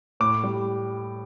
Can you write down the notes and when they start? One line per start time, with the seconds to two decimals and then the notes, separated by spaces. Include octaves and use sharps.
0.20 A2 D6
0.44 G3